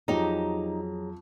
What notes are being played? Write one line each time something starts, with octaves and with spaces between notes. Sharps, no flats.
F2 F#3 D#4 G4 G#4 A#5